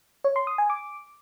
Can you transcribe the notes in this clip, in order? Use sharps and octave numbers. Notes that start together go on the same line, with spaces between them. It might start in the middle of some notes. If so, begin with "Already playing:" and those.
C#5
C6
D#6
G#5
D6